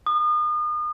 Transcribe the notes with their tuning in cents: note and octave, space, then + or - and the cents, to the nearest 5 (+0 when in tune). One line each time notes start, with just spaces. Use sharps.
D#6 -35